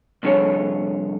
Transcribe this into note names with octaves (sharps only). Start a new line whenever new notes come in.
C2 F2 D3 G#4 C#5